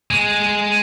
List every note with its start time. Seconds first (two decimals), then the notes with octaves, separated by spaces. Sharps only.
0.11 G#3